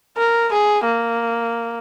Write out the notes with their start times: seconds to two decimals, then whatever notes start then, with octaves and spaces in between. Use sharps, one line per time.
0.17 A#4
0.52 G#4
0.84 A#3